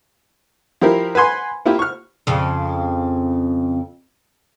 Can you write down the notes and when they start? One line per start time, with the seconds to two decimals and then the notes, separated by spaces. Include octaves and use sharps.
0.81 F3 E4 G4 A#4
1.15 B4 F#5 G#5 C6
1.65 A#3 E4 F4 G4
1.79 C#6 F6
2.27 F2 C#3